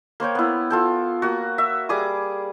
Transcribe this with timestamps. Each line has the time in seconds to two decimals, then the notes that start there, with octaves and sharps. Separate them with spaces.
0.20 A#3 C5 C#5 G5
0.35 B3 E4
0.70 F4 A4 G5
1.22 A#3 F#4
1.58 E5
1.89 G3 G#4 D6 D#6